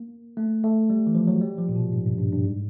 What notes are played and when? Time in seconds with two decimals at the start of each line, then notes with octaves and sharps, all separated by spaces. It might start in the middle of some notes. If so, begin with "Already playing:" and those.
Already playing: A#3
0.37 A3
0.64 A3
0.90 G3
1.07 E3
1.15 F3
1.27 F#3
1.41 G3
1.58 F3
1.69 A#2
1.76 B2
1.93 G#2
2.06 G2
2.18 G2
2.32 G2
2.44 G#2